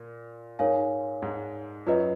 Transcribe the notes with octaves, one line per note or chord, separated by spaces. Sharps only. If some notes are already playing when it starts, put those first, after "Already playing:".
Already playing: A#2
G#2 G#3 D#4 A#4 C#5 F5 G#5
G#2 G#3
F#2 F#3 F4 B4 D#5